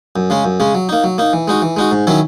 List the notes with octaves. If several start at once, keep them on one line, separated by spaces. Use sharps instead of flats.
F#2
C#3 G#3 C#4
F#2
C#3 G#3 C#4
F#3
A#3 D#4
F#3
A#3 D#4
E3
G#3 D#4 F#4
E3
G#3 D#4 F#4
G#2
D#3 F#3 C#4 E4